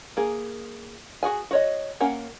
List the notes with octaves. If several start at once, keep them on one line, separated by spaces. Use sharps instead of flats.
A#3 G#4
F#4 G#4 G#5
F#4 C#5 D#5
A#3 C#4 F#5